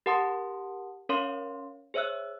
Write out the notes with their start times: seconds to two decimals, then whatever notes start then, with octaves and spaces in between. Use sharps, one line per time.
0.06 G4 A#4 F#5 A5 C6 D#6
1.09 C#4 A#4 C#5 F5 C6
1.94 G#4 C5 C#5 E5 E6 F#6